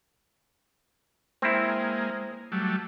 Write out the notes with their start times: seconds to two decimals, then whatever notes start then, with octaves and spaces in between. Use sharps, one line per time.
1.42 G#3 A#3 C4 E4
2.52 F#3 G3 A3